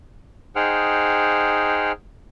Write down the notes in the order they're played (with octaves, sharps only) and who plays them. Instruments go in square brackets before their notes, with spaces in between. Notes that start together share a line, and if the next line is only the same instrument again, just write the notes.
[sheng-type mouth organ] D#4 G#4 C5 F#5 G5 F6